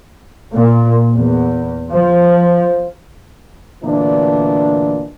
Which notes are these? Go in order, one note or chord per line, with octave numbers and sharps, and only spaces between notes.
A#2
E2
F3
D2 A#2 E3 D4 D#5